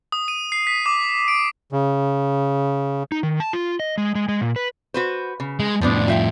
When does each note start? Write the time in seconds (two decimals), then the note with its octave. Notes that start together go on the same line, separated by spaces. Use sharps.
0.12 D#6
0.28 D#7
0.52 C7
0.67 B6
0.86 D6
1.28 D7
1.72 C#3
3.12 D#4
3.23 D#3
3.40 A5
3.53 F4
3.80 D#5
3.98 G#3
4.15 G#3
4.29 G#3
4.41 A#2
4.56 B4
4.94 F#4 B4 C5
5.40 C#3
5.60 G#3
5.81 F2 A2 F3 B3 D4
6.08 F4 E5 G5